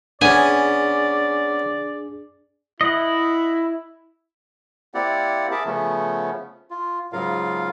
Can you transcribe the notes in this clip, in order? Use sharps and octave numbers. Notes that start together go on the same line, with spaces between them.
B3 C#4 D4 G#4 D5 G#5
E4 D#5 F#5
A#3 C4 E4 G4 D5 F#5
G#4 A#4 E5 A5 B5 D6
C#3 F3 A3 B3 C#4
F4
G#2 C#3 F#3 F4 A#4 F5